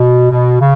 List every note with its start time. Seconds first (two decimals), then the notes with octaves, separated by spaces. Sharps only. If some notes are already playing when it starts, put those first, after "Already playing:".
Already playing: B2
0.31 B2
0.60 C#3